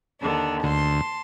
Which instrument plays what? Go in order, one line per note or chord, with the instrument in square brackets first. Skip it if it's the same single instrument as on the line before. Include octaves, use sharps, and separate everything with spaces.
[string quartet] D#2 D3 D4
[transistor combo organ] D2 [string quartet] A5 C6